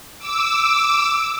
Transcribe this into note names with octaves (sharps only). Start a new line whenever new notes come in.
D6 E6